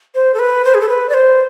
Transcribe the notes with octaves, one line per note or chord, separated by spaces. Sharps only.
C5
A4
B4
C5
G#4
A4
B4
D5
C5